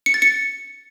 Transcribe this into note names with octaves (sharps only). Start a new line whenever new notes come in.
C#7
A6
C#7